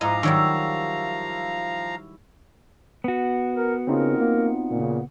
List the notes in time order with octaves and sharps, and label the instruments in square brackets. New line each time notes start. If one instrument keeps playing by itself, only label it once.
[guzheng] G#2 D#4 D#5 [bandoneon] F3 F5 A#5 [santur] E4 D6
[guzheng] D#3 F#3 G3 [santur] C#6 E6
[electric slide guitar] B3 F#4
[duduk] A#4
[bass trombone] C#3 [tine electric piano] C4 D#4 F4 [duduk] A#4
[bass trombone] A#3
[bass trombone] A#2 [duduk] C#3